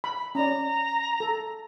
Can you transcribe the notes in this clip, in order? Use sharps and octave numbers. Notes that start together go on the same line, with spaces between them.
B5
C#4 D5 A#5
A4